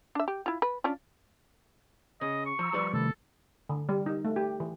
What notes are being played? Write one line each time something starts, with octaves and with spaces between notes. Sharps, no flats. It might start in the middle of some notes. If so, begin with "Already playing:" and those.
D4 E5
G4
E4 F4
B4
C#4 D4 F4
C#3 D#5
C#6
F3 A#5 E6
F3 G3 B4
C3 D#3 A3 A4
D3
G3
D#4
A3
G4
E3